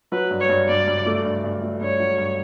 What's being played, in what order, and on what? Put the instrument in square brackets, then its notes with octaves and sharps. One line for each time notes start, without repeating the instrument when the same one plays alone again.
[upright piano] F#3 [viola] B4
[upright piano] G2
[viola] C#5
[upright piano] G2
[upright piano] G2 [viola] D5
[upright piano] G2
A3
G2
G2
A3
[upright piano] G2 [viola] C#5
[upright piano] F#3
G2